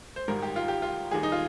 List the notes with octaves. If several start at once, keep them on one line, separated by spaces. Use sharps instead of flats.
C5
G#1 G#2 D#3 G3 A#4
G4
F4
G4
F4
D#2 D#3 G3 G#4
D#4
F4